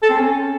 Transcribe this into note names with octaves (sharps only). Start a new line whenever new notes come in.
A4
C4
C#4